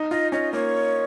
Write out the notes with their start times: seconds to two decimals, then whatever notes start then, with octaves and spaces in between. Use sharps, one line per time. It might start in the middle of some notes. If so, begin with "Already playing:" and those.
Already playing: D#4
0.11 F4 D#5
0.32 C#4 D#5
0.53 A#3 C#5